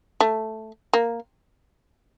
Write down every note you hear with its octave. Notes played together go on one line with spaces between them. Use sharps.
A3
A#3